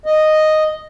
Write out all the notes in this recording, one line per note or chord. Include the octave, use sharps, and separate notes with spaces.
D#5